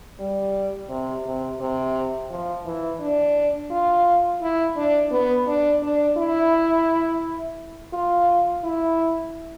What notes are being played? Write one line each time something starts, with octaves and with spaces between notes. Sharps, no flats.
G3
C3
C3
C3
F3
E3
D4
F4
E4
D4
B3
D4
D4
E4
F4
E4